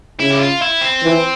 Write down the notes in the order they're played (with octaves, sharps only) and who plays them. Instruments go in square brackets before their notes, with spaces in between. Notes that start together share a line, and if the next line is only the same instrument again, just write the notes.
[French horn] C#3 [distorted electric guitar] E4
[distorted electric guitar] G4
F4
E4
C4
[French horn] E3